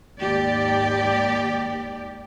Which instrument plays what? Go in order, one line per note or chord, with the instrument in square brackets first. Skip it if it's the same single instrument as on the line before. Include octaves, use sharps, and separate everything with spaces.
[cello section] D#2 G#2 G4 D5